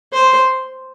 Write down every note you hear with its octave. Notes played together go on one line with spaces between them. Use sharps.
C5